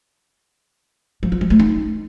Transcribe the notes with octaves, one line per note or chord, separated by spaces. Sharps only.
F3
F4
F3
A3
D#4